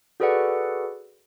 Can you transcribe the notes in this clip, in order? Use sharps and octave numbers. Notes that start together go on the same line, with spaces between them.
F#4 G#4 A4 B4 D5 F#5